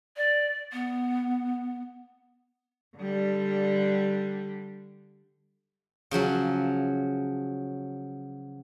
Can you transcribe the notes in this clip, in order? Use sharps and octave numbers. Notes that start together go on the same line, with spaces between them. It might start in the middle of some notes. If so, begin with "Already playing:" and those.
D5
B3
D3 G3
C#3 F3 F#3 C#4